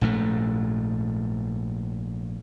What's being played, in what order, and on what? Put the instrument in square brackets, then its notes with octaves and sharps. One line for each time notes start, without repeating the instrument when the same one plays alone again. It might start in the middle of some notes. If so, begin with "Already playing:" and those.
[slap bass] A#1 G#2 C#3 A3